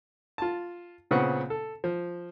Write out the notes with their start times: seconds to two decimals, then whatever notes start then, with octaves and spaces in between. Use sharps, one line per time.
0.38 F4 A5
1.11 A#2 C#3 B3 C4 F#5
1.50 A4
1.84 F3